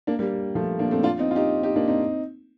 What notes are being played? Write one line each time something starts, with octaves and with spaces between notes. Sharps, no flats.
A#3 D4
G3 A#3
F3 A3
A#3 D4
A3 C4
D4 F4
C4 D#4
F4
D#4 G4
D#4 G4
A#3 D4
C4 D#4